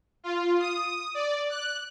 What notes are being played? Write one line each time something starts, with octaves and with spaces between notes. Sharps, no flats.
F4
D#6
D5
F#6